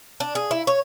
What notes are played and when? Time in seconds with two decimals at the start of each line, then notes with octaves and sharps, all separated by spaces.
0.20 D4
0.35 G#4
0.51 E4
0.67 C#5